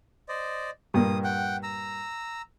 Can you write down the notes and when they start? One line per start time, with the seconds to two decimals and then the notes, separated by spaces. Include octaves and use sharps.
0.28 C5 D5 D#5
0.94 G2 A#2 A#3 D#6
1.24 F#5 G5
1.63 A#5 E6